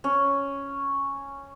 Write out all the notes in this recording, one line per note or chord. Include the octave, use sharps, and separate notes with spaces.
C#4